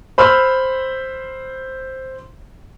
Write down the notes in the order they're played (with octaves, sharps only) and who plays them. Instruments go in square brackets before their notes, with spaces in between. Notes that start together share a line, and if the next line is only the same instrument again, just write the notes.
[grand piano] C5 B5 C6 E6 F6